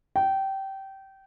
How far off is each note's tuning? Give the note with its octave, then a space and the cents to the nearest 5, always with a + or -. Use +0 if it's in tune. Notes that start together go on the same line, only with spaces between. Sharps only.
G5 -20